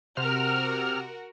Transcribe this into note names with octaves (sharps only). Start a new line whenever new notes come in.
C3 F#4 A#4 F6